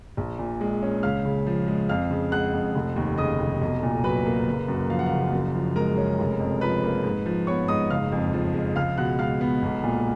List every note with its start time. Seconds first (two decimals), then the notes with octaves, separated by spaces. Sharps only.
0.17 A#1
0.39 A#2
0.61 G#3
0.83 C#4
1.03 C#2 F5 F6
1.25 C#3
1.47 F3
1.67 G#3
1.89 F2 F5 F6
2.11 C#3
2.32 G#3 F#5 F#6
2.53 F2
2.75 F1
2.96 D#2
3.18 C#3 D#5 D#6
3.40 F1
3.62 B1
3.83 A#2
4.03 F#3 B4 B5
4.26 A#3
4.47 F#1
4.68 F#2
4.90 F3 F5
4.99 F#5
5.06 F5
5.12 F#1
5.32 F#2
5.55 F3
5.76 G#3 A#4 A#5
5.98 C#4
6.19 F1
6.40 F2
6.61 F3 B4 B5
6.84 A#3
7.04 G#2
7.26 F3
7.47 B3 C#5 C#6
7.68 G#2 D#5 D#6
7.90 F#1 F5 F6
8.12 F2
8.33 F3
8.54 G#3
8.76 C#2 F5 F6
8.98 B2 F#5 F#6
9.19 G#3 F5 F6
9.41 B3
9.63 B1
9.84 A#2